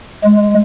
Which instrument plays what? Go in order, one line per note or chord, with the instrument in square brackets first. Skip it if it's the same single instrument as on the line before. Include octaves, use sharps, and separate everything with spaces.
[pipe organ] G#3